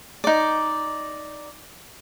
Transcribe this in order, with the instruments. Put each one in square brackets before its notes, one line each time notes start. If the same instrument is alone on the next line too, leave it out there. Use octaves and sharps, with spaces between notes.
[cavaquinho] D#4 D5